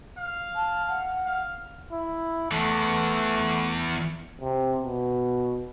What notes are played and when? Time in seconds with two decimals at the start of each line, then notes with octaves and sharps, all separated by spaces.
0.18 F5
0.55 A5
0.89 F#5
1.25 F5
1.92 E4
2.51 E2 E3 A3
4.41 C3
4.81 B2